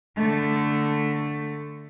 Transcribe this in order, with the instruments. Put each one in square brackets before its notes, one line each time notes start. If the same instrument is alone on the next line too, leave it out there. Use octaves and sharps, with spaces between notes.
[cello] D3 A3